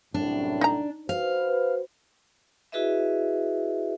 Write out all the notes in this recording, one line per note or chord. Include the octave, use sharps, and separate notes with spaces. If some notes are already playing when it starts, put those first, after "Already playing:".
C2 F#2 A2 D4
D#4 A#5
F#4 B4 C5 F5
E4 F#4 G#4 B4 D#5 E5